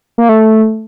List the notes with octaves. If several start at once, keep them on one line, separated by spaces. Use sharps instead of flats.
A#3
A3